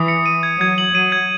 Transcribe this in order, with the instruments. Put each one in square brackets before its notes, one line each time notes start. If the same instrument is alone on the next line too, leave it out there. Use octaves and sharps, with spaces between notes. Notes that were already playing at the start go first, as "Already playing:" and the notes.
Already playing: [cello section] E3 [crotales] D#6
[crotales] C#7
D#7
G#6
[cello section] F#3 [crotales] G#6
[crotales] F#7
[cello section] F#3 [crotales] D#7
[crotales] G#6